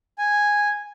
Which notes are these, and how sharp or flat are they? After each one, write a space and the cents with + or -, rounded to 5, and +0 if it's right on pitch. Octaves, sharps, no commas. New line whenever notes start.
G#5 -5